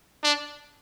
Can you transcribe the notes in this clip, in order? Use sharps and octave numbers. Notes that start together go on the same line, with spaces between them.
D4